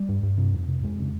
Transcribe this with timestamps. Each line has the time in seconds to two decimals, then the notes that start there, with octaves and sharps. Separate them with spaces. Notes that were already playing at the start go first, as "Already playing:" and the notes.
Already playing: G3
0.09 G2
0.23 G2
0.38 C3
0.53 F2
0.68 C3
0.83 F2 G#3
0.99 C#3